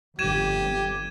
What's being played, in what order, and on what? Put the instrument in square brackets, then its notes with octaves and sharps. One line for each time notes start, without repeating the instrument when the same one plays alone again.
[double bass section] G1 F2 [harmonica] G4 [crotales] G#6 D#7 E7